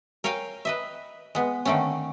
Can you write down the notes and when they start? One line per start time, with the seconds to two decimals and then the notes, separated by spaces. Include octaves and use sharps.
0.24 A#4 C#5 F5 G5 G#5
0.65 B4 D#5 E5
1.35 G#3 B3
1.65 D3 D#3 A3 C4 C#4